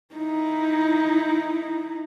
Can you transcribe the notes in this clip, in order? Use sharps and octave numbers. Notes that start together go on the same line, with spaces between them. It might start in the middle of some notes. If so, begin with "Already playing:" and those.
D#4 E4